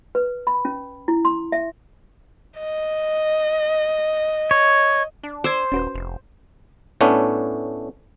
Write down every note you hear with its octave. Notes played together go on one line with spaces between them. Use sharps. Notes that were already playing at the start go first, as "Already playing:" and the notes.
B4
B5
C#4
E4
C6
E5
D#5
C#5
D4
C5 D6 E6 G#6
D#1 C#4 F#4 B4
F1
A2 A3 B3 C#4 D4